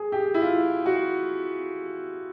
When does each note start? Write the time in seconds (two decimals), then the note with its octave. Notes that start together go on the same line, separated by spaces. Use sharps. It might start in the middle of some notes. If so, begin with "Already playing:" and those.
Already playing: G#4
0.12 G4
0.34 E4
0.42 F4
0.86 F#4